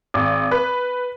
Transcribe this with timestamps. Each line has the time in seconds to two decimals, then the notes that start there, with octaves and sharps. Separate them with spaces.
0.14 G#1
0.51 B4